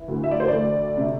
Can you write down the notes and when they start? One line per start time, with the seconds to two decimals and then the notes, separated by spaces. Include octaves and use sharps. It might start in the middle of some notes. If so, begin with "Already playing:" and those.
Already playing: E3
0.08 D2
0.23 E5
0.31 D5
0.40 C5
0.48 A3 D5
0.97 C3